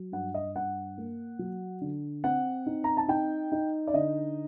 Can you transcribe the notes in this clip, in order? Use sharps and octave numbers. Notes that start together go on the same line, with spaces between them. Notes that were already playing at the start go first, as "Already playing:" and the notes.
Already playing: F#3
G2 F#5
D#5
G2 F#5
A#3
F#3
D3
C4 F#5
D#4
A#5
A5
D#4 G5
D#4
D5
D3 D#5